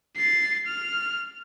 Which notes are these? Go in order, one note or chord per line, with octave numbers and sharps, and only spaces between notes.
A6 C7
F6